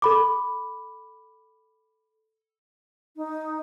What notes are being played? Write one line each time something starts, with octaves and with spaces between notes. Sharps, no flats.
A4 B5 D6
D#4